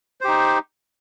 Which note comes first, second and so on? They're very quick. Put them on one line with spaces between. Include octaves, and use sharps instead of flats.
C5 G4 D#4